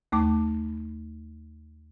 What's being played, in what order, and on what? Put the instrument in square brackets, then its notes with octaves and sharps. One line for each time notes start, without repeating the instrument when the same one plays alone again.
[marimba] D#2 A3 D6